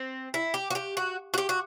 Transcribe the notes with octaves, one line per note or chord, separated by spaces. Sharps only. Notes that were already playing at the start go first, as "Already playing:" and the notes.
Already playing: C4
E4
G4
F#4
G4
F#4
F#4
G4
F#4